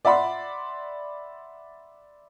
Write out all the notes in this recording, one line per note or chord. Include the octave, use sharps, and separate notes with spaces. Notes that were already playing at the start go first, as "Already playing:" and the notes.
D5 E5 F#5 B5 C6